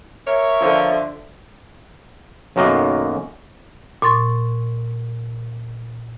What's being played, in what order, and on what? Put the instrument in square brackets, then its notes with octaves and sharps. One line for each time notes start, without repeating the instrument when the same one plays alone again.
[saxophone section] A#4 C#5 [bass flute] E5
[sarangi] D3 [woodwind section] F3
[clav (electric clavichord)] B1 F#2 D#3 A#3 F#4 D#5
[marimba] A#2 C6 C#6 A6